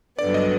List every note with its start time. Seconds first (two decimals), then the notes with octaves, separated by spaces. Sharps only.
0.19 G2 D3 F#3 B3 D5
0.34 D#5